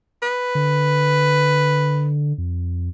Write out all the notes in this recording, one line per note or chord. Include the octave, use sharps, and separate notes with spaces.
B4
D3
F2